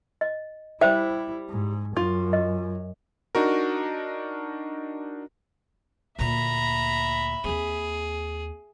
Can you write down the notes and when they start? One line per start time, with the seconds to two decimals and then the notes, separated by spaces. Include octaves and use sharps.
0.21 D#5
0.81 G3 E4 C5 E5 G5
1.50 G#2
1.97 F#2 F4
2.33 D#5
3.35 D4 D#4 F#4 A#4
6.19 D2 A#2 E5 A#5 B5
7.44 D#2 C4 G#4